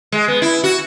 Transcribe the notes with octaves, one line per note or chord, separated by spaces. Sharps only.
G#3
B3
E4
F#4